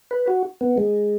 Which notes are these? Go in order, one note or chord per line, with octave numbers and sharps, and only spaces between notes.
B4
F#4
B3
G#3